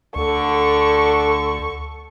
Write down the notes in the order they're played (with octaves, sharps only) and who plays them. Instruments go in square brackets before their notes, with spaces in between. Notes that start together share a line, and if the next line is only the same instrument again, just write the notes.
[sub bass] D2 [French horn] D3 [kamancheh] A4 C#6